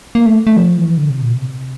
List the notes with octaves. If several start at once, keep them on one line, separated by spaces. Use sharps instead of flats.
A#3
A3
A3
F3
E3
D3
C3
A#2
C3